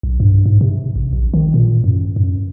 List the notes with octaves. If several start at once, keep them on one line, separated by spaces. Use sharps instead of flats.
B1
G2
G#2
C3
A1
A#1
D#3
A#2
F#2
F#2